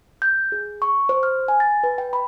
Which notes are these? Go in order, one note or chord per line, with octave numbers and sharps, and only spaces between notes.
G6
G#4
C#6
C5
F6
G#5
A6
B4
G5
B5